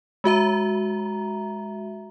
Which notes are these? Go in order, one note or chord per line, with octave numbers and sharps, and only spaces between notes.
G#3 F#4 E5 A#5